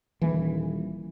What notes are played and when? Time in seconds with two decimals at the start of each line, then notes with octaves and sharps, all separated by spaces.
0.21 D#1 E3